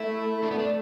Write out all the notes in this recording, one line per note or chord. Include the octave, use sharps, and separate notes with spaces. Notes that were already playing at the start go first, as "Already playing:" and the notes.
Already playing: A3 E4
A3 D4
B3
D4